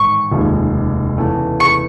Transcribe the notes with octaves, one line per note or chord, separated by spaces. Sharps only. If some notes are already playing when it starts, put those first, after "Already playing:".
Already playing: A1 G#2 D#3 C#6
F1 D#2 C#3 F3 G#3
E2 C#3 E3 A3
C#6